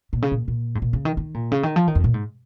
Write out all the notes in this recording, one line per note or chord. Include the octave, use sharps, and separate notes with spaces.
A#2
C#3
A#2
A#2
G#2
A#2
C#3
D#3
D#3
A#2
C#3
D#3
F3
D#3
F2
A#2
G#2